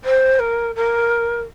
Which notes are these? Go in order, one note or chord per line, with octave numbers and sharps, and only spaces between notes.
C5
A#4
A#4